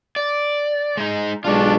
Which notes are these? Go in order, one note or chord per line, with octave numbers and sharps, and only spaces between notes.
D5
G#3 D#4
B1 G#3 D4 F4 C#5